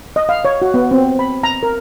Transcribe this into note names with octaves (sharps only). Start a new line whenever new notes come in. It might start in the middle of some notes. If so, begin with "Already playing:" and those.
D#5
F5
C#5
F#4
B3
C4
B5
A#5
A#4